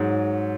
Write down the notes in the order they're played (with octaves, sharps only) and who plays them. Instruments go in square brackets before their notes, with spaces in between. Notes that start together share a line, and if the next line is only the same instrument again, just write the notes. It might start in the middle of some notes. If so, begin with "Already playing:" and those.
Already playing: [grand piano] G#2 F#3